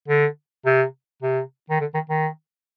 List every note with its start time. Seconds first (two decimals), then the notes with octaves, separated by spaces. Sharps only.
0.09 D3
0.66 C3
1.23 C3
1.70 D#3
1.81 D3
1.94 D#3
2.10 D#3